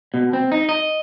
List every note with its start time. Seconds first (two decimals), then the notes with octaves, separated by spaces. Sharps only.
0.14 B2
0.33 C4
0.52 D#4
0.69 D#5